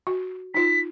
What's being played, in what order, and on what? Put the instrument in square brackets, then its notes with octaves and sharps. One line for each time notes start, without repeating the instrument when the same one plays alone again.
[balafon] F#4
[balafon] D#4 F4 [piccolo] B6